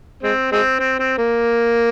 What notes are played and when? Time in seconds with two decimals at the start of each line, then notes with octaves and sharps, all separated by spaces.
0.23 G#3 C4
0.52 G#3 C4
0.80 C4
0.99 C4
1.18 A#3